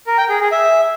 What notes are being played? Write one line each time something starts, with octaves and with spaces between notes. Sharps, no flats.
A#4
G5
G#4
G#4
E5